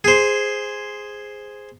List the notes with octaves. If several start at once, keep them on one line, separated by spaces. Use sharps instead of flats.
G#4 C5